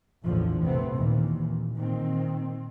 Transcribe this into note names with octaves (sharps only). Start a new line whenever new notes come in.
A#1 E2 A2 D3 F3
C3 A3 B3 C4
D#2 A#2 D#3 E3
A#2 D#3 C4